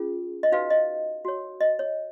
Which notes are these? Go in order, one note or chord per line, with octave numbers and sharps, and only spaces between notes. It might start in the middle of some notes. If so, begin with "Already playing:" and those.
Already playing: C#4 F4 G#4
D#5
D#4 F#4 B4 F5
D#5
F#4 C#5
D#5
C#5